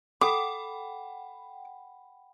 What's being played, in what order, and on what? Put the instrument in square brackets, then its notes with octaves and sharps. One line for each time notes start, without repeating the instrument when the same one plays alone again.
[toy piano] A4 [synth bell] F#5 G5 B5 [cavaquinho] D6